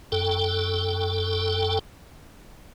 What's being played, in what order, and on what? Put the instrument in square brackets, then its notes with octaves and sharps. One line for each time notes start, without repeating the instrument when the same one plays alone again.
[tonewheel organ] F#2 A4 G5